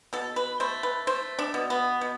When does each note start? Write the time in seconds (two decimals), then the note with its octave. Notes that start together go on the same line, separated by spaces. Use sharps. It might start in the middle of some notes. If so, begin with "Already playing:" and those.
0.13 B2 A4
0.36 B4
0.60 A3 C5
0.83 B4
1.07 A3 C5
1.39 D4
1.54 B2
1.70 B3
2.01 B2